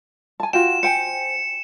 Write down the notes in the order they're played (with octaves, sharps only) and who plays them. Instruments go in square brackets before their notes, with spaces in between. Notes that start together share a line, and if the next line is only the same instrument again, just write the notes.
[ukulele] G#5 A5
[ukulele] F4 F#4 G5 [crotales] E7
[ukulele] C5 G5 G#5 [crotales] C#7